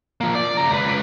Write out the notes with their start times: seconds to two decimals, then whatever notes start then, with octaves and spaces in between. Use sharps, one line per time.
0.21 F3 A#3
0.35 D5
0.57 C#3 A#5
0.71 C#2 B4